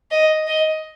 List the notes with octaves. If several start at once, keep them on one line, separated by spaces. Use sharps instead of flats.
D#5
D#5